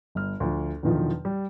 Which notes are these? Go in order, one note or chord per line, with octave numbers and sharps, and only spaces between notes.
G1 F6
D2 F3
E2 B2 D3 D#3 F3 F#3
G3